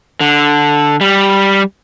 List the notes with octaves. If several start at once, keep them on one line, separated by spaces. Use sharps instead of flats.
D3
G3